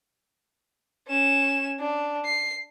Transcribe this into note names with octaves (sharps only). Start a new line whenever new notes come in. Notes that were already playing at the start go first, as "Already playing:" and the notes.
C#4 E7
D4
C7